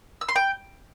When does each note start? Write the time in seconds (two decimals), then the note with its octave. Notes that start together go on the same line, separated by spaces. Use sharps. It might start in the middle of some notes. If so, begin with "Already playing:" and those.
0.21 E6
0.28 C6
0.36 G5